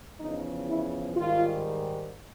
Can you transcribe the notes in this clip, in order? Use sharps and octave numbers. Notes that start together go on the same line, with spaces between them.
E2 C#3 F3 D#4
E4
G#2 D#3 G3 F4